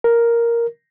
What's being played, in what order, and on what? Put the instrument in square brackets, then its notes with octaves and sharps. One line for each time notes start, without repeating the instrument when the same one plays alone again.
[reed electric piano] A#4